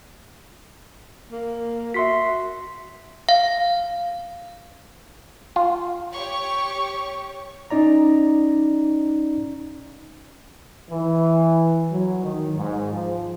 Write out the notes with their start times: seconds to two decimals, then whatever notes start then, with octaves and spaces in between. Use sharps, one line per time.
1.32 A#3
1.94 F#4 E5 C6 B6
3.29 F5
5.56 F4
6.13 G4 C#5 C#6
7.70 C#4 D#4 D5 A#5
10.90 E3
11.90 F#3
12.23 D#3
12.55 G#2
12.91 F3